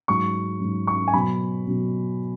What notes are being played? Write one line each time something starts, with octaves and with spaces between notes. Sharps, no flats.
G#2 F#3 C#6
G#2 F#3
C#6
G#5
B2 F#3 B5
B2 F#3